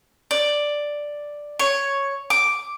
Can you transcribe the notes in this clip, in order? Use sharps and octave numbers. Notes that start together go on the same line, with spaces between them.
D5
C#5
D6